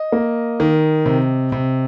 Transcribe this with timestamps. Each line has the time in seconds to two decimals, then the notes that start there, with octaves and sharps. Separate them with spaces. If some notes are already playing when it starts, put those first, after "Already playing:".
Already playing: D#5
0.12 A#3
0.60 D#3
1.06 C3
1.52 C3